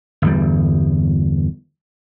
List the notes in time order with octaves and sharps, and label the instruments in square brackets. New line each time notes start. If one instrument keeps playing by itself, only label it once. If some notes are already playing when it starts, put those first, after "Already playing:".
[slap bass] G1 E2 G3